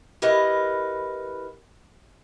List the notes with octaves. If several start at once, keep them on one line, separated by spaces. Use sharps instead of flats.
E4 G4 A#4 B4 D#5 F#5